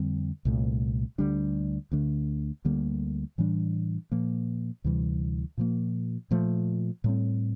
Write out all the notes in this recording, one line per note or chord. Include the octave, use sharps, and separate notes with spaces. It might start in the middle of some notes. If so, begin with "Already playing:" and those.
Already playing: F2 D3 G3 C4
C2 A#2 A3
D2 D3 G3 D4
D2 D3 A3 D4
D2 D3 G3 A#3
A2 E3 G3 D4
A#2 F3 A#3
D2 C3 E3 G3
A#2 F3 A#3
A#2 F3 A3
A2 G3 C4